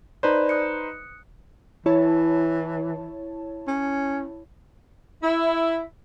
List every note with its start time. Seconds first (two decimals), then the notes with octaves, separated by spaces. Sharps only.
0.23 D#4 B4 C5 D5 A5 A#5
0.49 D#6 F#6 C#7
1.86 E3 E4 C#5 A5
3.67 C#4
5.22 E4